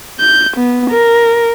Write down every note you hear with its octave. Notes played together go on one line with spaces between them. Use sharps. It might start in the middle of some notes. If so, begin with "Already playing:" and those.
G6
B3
A#4